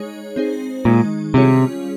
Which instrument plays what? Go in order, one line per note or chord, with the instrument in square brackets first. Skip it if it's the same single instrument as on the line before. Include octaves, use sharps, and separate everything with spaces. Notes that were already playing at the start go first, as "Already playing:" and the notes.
Already playing: [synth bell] G#3 D#4 G#4 C#5
C4 D#4 G#4 C5
[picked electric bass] A#2 [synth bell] D#3 G#3 D#4
[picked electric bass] C3 [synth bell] G3 C#4 F4 G#4 C#5